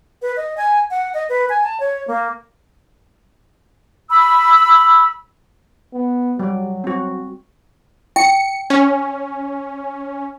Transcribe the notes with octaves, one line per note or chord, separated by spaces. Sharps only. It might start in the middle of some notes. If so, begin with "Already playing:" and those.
B4
D#5
G#5
F#5
D#5
B4
G#5
A5
C#5
A#3
B5 E6
B3
F#3 G3 D5
C4 F#4
G5 C#7
C#4